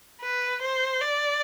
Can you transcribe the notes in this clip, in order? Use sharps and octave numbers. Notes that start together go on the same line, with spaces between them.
B4
C5
D5